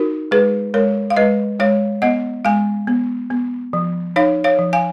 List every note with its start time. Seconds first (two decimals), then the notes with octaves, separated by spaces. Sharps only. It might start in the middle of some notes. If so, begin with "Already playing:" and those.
Already playing: D#4 F#4 A#4
0.31 G#3 G#4 B4
0.74 G#3 A#4 C#5
1.10 F5
1.17 G#3 B4 D#5
1.59 G#3 C#5 F5
2.02 B3 D#5 F#5
2.45 G#3 F5 G#5
2.87 B3
3.31 B3
3.73 F3
4.16 D#4 C#5 F5
4.44 C#5 F5
4.59 F3
4.73 F5 G#5